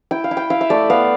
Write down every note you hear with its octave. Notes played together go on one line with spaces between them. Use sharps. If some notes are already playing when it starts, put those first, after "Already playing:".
E4 G5
F5
E4
G5
E4 F5
E5
A3 D5
B3 F5